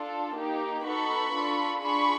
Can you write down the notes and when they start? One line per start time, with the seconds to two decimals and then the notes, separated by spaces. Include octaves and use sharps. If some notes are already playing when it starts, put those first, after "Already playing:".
Already playing: D4 F4 A4
0.35 A#3 D#4 G4
0.84 B3 D#4 F#4 A4 B5 C#6
1.34 D4 F4 A4
1.82 D4 F4 G#4 B5 C#6